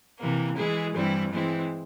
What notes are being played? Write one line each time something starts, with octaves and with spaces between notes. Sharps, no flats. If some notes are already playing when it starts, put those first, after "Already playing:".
C3 E3 A#3
E3 G#3 E4 G#4
G2 E3 G3 C4 E4
E3 G#3 C4 E4